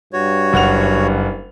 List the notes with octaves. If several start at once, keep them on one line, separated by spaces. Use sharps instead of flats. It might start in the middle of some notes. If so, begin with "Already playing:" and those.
G2 F#4 C#5
F#1 F#5 F7